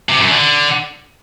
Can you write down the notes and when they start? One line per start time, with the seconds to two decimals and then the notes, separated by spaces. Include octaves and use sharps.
0.09 C3
0.20 F#2
0.30 D3